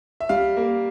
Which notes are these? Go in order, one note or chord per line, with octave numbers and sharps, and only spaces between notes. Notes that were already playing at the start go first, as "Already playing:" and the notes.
E5
G3 F5
A#3